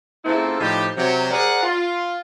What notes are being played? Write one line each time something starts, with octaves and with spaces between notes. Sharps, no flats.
C#3 A#3 C4 E4 F4 A4
A2 F3 G3 D#4 G4
C3 F#3
G#4 A#4 C5 D5 F#5
F4